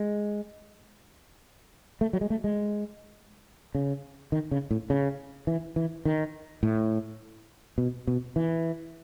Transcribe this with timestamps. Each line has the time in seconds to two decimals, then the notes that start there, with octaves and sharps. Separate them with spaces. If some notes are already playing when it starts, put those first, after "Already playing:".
Already playing: G#3
2.01 A3
2.13 F#3
2.21 G#3
2.30 A3
2.44 G#3
3.75 C#3
4.32 D#3
4.51 C#3
4.71 A2
4.90 C#3
5.47 E3
5.76 E3
6.05 D#3
6.63 A2
7.78 B2
8.07 B2
8.36 E3